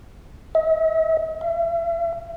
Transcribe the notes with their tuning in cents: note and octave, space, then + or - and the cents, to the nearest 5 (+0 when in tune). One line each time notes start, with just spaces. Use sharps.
E5 -45
E5 +40